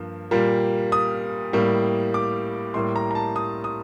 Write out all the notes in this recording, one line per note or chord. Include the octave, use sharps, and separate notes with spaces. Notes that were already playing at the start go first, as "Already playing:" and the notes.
Already playing: G2 F3 A#3
A#2 G3 A#3
D#6
A2 G3 A#3
D6
A2 G3 A#3 C6
A#5
A#5
A5
D#6
D#6